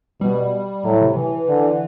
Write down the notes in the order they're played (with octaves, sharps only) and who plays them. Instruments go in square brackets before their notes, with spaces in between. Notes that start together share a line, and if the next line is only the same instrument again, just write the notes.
[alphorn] B2 [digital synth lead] G3
[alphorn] A2 [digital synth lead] F#3
[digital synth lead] C3
E3
[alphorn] D3